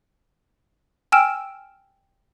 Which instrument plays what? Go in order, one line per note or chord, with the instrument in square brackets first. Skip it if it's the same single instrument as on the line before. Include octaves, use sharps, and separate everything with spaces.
[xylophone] G5 G#5 E6 F6 D7 E7